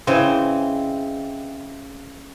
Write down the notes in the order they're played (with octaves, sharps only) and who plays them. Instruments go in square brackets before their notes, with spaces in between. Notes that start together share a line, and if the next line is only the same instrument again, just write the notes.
[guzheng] C#3 [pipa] E3 G#3 C4